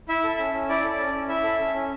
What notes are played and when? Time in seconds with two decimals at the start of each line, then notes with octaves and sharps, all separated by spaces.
0.08 E4 E5
0.24 A4
0.38 C#4
0.53 C#4
0.69 E4 D5
0.84 A4
0.99 C#4
1.14 C#4
1.28 E4 E5
1.43 A4
1.59 C#4
1.74 C#4